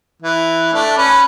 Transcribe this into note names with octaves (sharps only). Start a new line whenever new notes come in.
E3
A3 D4
C#4 B4